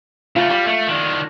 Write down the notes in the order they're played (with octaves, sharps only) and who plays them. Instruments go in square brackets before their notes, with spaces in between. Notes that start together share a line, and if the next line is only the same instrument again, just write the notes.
[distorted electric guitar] C#3 A3 [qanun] F4
[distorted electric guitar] G3 [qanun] B5
[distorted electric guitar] A3
D#3 D4